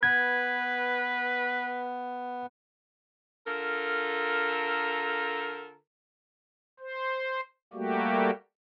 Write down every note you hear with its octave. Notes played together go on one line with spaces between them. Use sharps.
B3 B4 G#6
D3 F4 A4 A#4
C5
G3 A3 A#3 F#4 G4